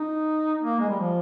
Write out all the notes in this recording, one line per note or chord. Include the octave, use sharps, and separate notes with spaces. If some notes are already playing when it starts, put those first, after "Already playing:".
Already playing: D#4
A#3
G#3
G3
F3